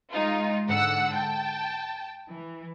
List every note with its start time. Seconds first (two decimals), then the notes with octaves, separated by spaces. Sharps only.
0.11 G#3 D#4 F4
0.66 G#2 D3 F#5 E6
1.13 G5 A5
2.32 E3